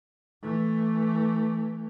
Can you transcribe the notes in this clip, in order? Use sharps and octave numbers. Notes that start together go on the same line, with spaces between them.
E3 A3